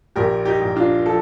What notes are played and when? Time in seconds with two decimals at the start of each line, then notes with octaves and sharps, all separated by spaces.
0.16 A#1 G4 A#4
0.45 D#4 G4
0.61 A#1
0.76 D4 F4
1.06 F3 A4